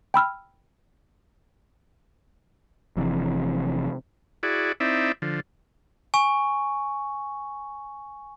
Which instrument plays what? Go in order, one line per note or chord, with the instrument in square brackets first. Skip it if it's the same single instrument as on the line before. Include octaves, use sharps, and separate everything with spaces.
[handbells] G5 B5 E6 F6
[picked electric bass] F1 F2 C3 E3
[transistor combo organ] E4 F#4 G#4 D5
C4 D#4 E4 D5 E5
D3 F3
[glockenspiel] G#5 C#6